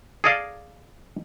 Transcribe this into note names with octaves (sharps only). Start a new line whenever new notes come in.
G#4 A4 D5 D#5 F5